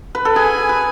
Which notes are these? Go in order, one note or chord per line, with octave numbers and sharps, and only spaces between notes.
B4
A4
G#4 G#5
B4